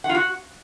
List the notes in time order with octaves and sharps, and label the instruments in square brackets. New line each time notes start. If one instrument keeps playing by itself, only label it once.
[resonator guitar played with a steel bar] F#5
F4
F#4